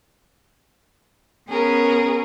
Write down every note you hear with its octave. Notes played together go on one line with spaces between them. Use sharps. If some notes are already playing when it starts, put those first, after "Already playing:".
B3 C#4 G#4 A#4